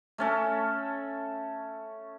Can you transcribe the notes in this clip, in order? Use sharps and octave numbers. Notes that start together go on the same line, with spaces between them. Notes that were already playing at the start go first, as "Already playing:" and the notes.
A3 C#4 A4